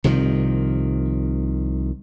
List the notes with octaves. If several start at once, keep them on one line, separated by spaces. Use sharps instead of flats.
C2 C3 D#3 F3